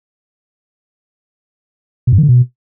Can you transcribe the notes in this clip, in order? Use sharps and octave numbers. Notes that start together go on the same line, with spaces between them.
B2
G2
D#3
D3
B2